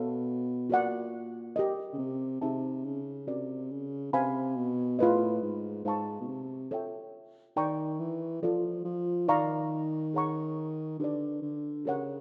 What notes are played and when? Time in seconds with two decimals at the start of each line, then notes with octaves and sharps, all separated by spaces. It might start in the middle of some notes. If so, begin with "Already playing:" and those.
Already playing: B2 A4 C#5 F5
0.70 A#2 F#4 A#4 D5 F#5
1.56 G4 A#4 D#5
1.93 C#3
1.98 C3
2.41 C3 D#4 G#4 C5 E5 A5
2.85 C#3
3.27 C3 F#4 A#4 D5
3.71 C#3
4.13 C3 C5 F5 G#5 B5
4.56 B2
4.99 A2 F4 G#4 B4 D#5
5.42 G#2
5.85 G#2 C5 F5 A5 C#6
6.21 B2
6.28 C3
6.71 F4 A4 C#5 E5 G5
7.57 D#3 A#4 D5 G5 A#5 C#6
8.00 E3
8.42 F3 F4 A4 D5
8.85 F3
9.28 D#3 A#4 D5 F5 A#5 C#6
10.14 G#4 C#5 F#5 A#5 C#6
10.99 D3 G4 B4 D5
11.42 D3
11.85 C#3 G4 A#4 C#5 F#5